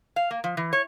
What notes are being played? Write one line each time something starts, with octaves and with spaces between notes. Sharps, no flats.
F5
A#3
F3
E3
C#5